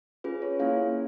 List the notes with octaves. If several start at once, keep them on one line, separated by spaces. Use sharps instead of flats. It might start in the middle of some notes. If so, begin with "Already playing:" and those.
C#4 F4 G#4 B4
C#5
A#3 C#4 E4 G#4 F5